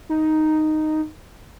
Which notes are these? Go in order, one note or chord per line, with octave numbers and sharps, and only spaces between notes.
D#4